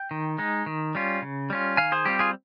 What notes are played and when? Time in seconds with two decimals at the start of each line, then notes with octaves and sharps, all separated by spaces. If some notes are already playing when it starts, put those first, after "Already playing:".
Already playing: G5
0.11 D#3
0.38 G#3 D#4
0.66 D#3
0.95 G3 C#4 F4
1.22 C#3
1.50 G3 C#4 F4
1.77 D#3 F5 G#5
1.92 G#4 C5
2.05 G3 C4 F4 G4
2.19 F4 G#4